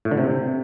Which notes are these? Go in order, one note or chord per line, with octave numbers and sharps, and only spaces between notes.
A2
D3
C3